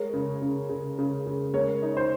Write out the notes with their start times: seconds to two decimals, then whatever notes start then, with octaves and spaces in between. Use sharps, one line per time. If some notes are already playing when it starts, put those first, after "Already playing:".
Already playing: G#3 A#4 C#5
0.14 C#3
0.42 C#3
0.70 C#3
0.99 C#3
1.27 C#3
1.53 G#3 A#4 C#5
1.82 D#4
1.97 C5